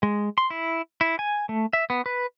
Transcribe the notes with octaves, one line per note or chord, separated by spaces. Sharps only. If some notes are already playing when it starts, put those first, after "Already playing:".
G#3
C6
E4
E4
G#5
A3
E5
B3
B4